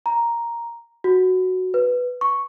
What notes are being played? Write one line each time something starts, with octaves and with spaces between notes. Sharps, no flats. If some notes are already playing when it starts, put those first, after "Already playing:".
A#5
F#4
B4
C#6